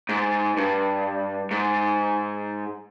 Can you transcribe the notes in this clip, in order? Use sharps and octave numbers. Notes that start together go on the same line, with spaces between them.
G#2
G2
G#2